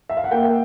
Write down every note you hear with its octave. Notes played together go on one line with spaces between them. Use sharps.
E5
F5
F#5
A#3 G5